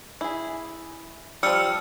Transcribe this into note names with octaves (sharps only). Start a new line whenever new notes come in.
E4 G#4
F3 G3 E6 F6 C#7